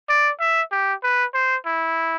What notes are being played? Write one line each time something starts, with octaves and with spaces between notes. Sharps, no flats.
D5
E5
G4
B4
C5
E4